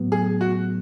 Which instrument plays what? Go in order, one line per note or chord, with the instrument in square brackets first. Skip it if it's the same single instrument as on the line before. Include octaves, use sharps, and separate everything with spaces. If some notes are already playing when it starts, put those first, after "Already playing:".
Already playing: [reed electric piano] A2 F#3 B3
[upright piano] G#4
F#4